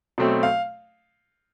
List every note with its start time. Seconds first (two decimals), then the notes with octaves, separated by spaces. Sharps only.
0.18 B2 F#3 A3 C4
0.43 F5